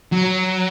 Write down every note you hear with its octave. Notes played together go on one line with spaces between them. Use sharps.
F#3